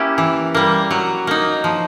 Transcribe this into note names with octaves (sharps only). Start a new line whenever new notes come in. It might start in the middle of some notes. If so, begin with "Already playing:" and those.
Already playing: A#3 C#4 E4 G4
E3
G3 A#3
F#3
A#3 D#4
F3